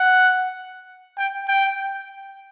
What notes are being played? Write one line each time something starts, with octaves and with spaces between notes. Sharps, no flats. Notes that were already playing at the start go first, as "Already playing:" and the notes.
Already playing: F#5
G5
G5